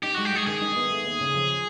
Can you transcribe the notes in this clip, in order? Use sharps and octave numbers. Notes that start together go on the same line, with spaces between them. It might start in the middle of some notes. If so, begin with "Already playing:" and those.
D#4 G4
G#3 F#4
G4
G#3 G#4
D#3 G#4
D#4
B3
A3
D#2
C#3
F3